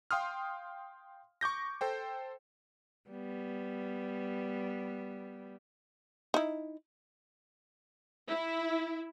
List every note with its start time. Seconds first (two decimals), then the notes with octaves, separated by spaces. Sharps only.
0.11 F5 G5 C6 D#6 F6
1.41 C#6 D6 G6 A#6
1.81 A4 C5 G5
3.10 G3 B3
6.34 D#4 E4
8.29 E4